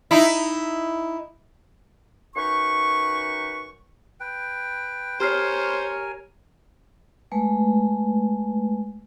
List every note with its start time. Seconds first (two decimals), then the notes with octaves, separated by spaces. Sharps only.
0.11 D#4 E4
2.37 F#2 D#4 B4 C#6
4.20 B4 G5
5.20 G4 A#4 C5 C#5 G#5 F6 C7
7.32 G#3 A3 B4